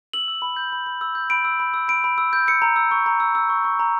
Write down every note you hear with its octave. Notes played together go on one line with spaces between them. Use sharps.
E6 F#7
E6
B5
G6
B5
B5
E6
G6
B5 D7
E6
B5
E6
B5 D7
B5
E6
G6
E6 C#7
A#5
E6
C#6
A#5
E6
E6
C#6
C#6
A#5